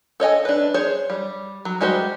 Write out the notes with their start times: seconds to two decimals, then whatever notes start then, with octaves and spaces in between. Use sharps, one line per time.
0.20 A4 C#5 D#5 G#5
0.45 D4 B4
0.74 G#4 C5 C#5
1.10 G3
1.65 F#3
1.81 G3 G#3 F#4 G4 C5